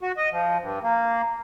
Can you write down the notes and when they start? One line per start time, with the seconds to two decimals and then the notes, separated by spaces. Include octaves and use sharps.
0.01 F#4
0.17 D#5
0.32 F3
0.61 G2
0.83 A#3